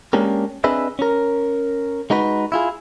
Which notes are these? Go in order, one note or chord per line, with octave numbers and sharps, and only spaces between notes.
G#3 A#3 C#4 D4 G4 A#4
C4 D4 G#4 B4 D#5 E5
C#4 A#4
G#3 D#4 F#4 B4
E4 F4 G#4